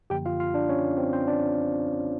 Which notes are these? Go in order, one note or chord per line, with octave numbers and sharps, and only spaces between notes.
F#2 D3 F3 A#3 G4 G5
F4 F5
F4 F5
D4 D5
C#4 C#5
C4 C5
C4 C5
D4 D5